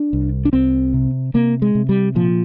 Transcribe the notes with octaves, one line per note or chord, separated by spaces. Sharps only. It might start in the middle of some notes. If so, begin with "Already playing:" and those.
Already playing: D4
C2
D4
C2 C4
C3
C3 A#3
G#3
C3
G3
A#2 F3